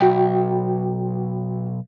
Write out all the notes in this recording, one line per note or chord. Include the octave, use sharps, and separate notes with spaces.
B1 F#4 G5